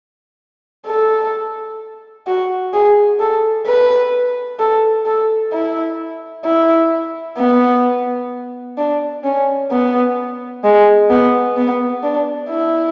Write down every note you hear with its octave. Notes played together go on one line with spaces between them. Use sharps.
A4
F#4
G#4
A4
B4
A4
A4
E4
E4
B3
D4
C#4
B3
G#3
B3
B3
D4
E4